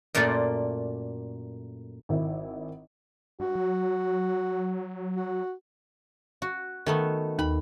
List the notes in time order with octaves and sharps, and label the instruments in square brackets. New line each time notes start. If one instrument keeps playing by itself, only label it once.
[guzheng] F#2 A#2 A3 C5 D5
[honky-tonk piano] G#1 D#3 E4
[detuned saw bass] G2 [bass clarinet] F#4
[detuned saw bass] F#3
[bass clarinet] F#4
[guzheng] F#4
D#3 A3 B3
[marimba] D#2 [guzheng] B5